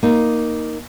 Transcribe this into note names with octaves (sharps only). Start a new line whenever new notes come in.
A#3 D#4